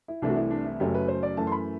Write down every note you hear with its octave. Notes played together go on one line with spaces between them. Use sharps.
E4
C2 C3 E3 A3 D4
F#4
E4
D4
E4
F#1 F#2 F#3 A3 G4
B4
C5
D5
F#2 E3 A3 A5
C6
B5